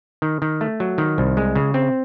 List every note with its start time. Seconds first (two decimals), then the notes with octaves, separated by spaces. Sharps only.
0.22 D#3
0.42 D#3
0.61 A3
0.80 F#3
0.98 D#3
1.18 C2
1.37 G#3
1.56 C#3
1.74 C4